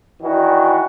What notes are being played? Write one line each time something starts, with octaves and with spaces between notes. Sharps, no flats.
D#3 E3 D4 F#4